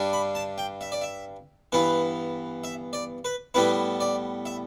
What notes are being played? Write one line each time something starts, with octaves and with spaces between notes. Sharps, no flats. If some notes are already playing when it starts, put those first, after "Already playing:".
Already playing: G2 G3 D4
B5
A5
G5
E5
D5
E5
G2 E3 B3 E4 B4
E5
D5
B4
A2 G3 B3 E4 B4
D5
E5